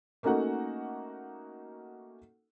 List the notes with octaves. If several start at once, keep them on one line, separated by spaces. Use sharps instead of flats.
A3 A#3 C#4 D#4 F#4 F#5